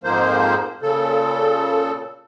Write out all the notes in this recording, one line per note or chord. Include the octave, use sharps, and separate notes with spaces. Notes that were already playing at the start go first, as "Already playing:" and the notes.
F2 G#2 F3 A#3 C5
A#2 C#3 A4